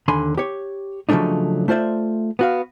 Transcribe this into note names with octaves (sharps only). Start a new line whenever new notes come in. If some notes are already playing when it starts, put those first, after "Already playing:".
D#2 D3 G#5 B5 C6
G4 C#5
C#3 F3 F#3 A3 D4 D#4
A3 F4 C5 D5 E5
B3 F#4 F5